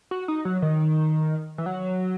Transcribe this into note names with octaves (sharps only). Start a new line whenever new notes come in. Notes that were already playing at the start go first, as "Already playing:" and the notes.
F#4
D#4
F#3
D#3
E3
F#3